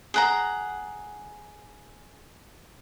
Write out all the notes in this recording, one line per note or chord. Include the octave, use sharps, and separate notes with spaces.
G#4 F#5 A#5